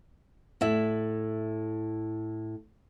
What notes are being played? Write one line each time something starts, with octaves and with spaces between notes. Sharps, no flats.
A2 E4 E5